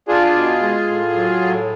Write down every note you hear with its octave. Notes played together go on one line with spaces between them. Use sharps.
D4 F4 G#4
B2
G#3
A2
F#3
A2